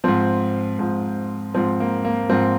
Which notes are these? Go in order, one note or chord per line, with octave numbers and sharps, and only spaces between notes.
G#2 F3 C4
G#2 F3
G#2 F3 C4
A#3
A#3
G#2 F3 C4